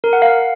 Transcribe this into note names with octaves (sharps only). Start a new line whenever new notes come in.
A#4
F#5
F5